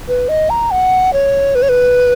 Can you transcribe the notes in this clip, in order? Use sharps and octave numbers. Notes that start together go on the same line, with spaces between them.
B4
D#5
A#5
F#5
C#5
B4
C#5
B4